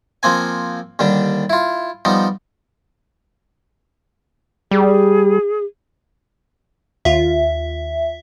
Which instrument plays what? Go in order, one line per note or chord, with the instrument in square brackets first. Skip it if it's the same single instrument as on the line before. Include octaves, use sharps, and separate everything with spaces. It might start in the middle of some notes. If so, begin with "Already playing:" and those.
[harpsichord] F3 A#3 C4 G#5
D#2 D3 G3 D4
E4 F4
F3 G3 B3 D#4
[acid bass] G3 [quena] G#4
[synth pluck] D#2 F4 [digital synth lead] E5